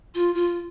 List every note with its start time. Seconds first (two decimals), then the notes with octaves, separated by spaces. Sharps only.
0.14 F4
0.34 F4